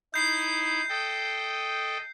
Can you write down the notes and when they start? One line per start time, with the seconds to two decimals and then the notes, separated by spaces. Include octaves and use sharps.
0.14 D#4 E4 G6 C7
0.89 A4 D#5 G5